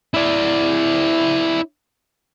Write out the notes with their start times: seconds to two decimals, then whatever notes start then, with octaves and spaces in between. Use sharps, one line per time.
0.14 E4 D5